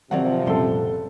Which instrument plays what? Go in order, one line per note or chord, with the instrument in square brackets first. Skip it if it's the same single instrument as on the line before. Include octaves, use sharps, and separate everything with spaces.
[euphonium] C3 [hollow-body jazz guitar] D#3 F#3 A#4 [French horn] F3 [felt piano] C4 D5 F#5
[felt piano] F#1 A4 [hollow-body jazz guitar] A#2 G3 C6